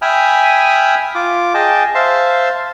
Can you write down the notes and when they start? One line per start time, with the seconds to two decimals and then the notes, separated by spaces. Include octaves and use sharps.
0.02 E5 G5 G#5 B5 D#6 F6
1.15 F4 D6
1.54 G#4 D#5 G5 A5
1.95 C5 E5 F5 A5 C6